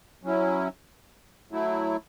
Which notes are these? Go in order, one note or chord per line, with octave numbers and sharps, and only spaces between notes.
F#3 C#4 E4
F#3 A3 E4